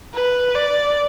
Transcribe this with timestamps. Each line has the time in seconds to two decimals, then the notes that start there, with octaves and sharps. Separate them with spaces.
0.14 B4
0.55 D5